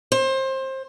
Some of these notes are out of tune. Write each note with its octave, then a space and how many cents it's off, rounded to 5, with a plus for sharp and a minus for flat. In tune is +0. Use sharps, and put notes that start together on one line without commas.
C5 +25